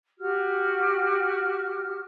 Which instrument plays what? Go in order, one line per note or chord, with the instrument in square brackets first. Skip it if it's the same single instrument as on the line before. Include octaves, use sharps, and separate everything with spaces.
[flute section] F#4 G4 F6